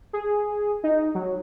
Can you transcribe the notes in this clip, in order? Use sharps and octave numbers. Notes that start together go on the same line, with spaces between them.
G#4
D#4
F#3